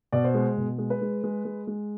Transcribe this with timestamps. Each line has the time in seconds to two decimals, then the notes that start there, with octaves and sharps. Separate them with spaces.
0.12 B2 D5
0.24 C5
0.34 G#3
0.57 B2
0.78 G#3
0.90 B4
1.02 G#3
1.24 G#3
1.45 G#3
1.67 G#3